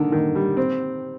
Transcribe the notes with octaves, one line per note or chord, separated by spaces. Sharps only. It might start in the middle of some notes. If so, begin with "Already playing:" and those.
Already playing: D3 D#3
D#3
G3
C4